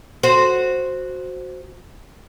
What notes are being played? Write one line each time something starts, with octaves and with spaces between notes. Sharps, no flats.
F#4 C5